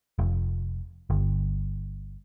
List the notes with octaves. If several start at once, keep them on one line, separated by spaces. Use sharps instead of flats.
F1
G1